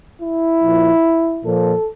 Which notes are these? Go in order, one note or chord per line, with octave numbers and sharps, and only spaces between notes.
E4
A#2 F3
A#2 F3 A4